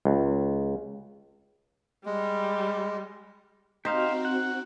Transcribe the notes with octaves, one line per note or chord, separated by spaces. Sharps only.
C#2
G3 G#3
C4 D#4 F#4 G4 C5 F5
F#5